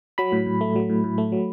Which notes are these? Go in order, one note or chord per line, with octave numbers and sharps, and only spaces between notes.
F#3 B5
A2
A2
A3
F#3
A2
A2
A3
F#3